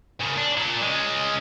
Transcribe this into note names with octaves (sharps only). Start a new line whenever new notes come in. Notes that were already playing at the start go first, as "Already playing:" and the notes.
C#3 A#3
D4
A#2
G#3 C#4